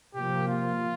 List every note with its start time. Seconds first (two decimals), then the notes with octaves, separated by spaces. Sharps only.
0.15 C3 F3 A#3 G4
0.48 F4